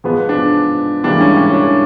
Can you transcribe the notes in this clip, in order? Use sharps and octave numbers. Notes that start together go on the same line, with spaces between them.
G#2 F3 G#3 B3
D4
G#2 E3 G3 A#3 D4
C#4
C#4
D4